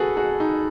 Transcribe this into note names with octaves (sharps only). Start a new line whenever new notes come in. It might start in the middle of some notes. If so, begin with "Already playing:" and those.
Already playing: F#4 G#4 A4 B4
F#4 G#4
D#4